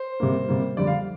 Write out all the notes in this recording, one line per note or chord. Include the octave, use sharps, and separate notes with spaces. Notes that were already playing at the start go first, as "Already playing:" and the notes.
Already playing: C5
C3 G3 A#3
C3 G3 A#3
F2 D3 G3 D5
F5